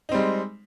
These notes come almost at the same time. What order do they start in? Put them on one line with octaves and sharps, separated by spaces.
D#4 C4 G3 G#3